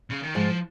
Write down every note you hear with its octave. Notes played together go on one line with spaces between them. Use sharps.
C#3
D#3
G#2 F3